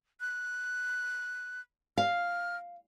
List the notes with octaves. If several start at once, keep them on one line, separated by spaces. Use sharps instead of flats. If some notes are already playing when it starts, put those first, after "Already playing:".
F#6
F5 F6